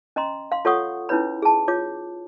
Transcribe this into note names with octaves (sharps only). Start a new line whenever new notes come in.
C#4 D#5 A#5 C6
F5 C6
F4 A4 C#5 F#5 C#6 D#6
C#4 D#4 E4 B4 C#5 B5
G#4 A5
F4 C#5 D6